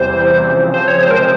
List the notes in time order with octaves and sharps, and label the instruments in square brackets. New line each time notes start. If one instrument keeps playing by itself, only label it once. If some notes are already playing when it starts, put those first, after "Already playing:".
Already playing: [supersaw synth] E2 C3 E3 G3 [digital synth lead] C5
[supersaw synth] C#3 F3 C4
[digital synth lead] C5
C#5
[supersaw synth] C3 F3 G#3 C4 [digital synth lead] C5
[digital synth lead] A#4
C5